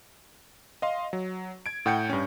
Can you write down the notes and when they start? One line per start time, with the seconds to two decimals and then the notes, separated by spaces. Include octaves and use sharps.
0.82 D#5 F5 C6
1.13 F#3
1.66 G#6 D7
1.86 A2 F#5 G5 G6 C#7
2.10 G2 C#4